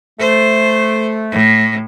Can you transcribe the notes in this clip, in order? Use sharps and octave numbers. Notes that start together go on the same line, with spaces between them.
A3 C5
A2